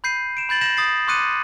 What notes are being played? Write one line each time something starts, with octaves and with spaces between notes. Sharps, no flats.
B5 G6 C7 D#7
D7 E7
B5 G6 A6 F#7
G6 A#6 E7 F#7
D#6 A6 C7
C6 D6 D#6 F#6 C#7 D#7